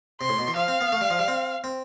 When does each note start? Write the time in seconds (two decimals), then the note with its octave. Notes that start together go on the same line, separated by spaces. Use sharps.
0.21 C3 C6
0.29 A2
0.39 B2
0.48 E3
0.56 F3 F5
0.68 C4
0.81 B3
0.92 A3
1.01 G3
1.10 F3
1.19 G3
1.28 C4
1.64 C4